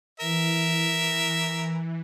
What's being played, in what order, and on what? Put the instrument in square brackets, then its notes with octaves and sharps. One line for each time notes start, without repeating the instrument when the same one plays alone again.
[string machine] E3 [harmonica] A#4 E5